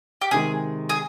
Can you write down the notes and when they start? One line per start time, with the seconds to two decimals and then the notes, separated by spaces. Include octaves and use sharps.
0.21 G4
0.31 C3 D#3 G#3 G#4
0.89 G#4